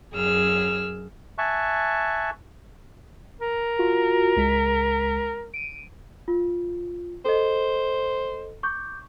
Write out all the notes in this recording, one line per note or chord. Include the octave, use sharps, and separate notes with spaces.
F#2 G#4 E6 F6
E5 G#5 A5 C#6 F#6
A#4
F4 F#4
C#2 G#3 B6
D7 D#7
F4
A4 C5 D#5
C#6 D6 G6